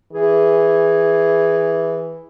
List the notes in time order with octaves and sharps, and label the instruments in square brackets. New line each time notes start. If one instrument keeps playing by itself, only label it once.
[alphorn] E3 [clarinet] G#4